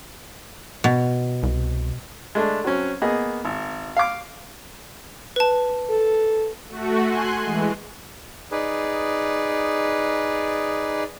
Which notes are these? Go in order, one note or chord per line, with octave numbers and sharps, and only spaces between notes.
B2
C2
G#3 A3 D4
F#3 C4 C#4
A#3 B3 G#4 D#5
G#1
F5 D6
B4 A5
A4
A3 F#4
G#5 C6 F#6
E3 G#3
D#4 G#4 B4 D5